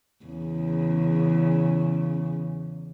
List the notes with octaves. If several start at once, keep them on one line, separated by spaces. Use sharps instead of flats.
E2 C#3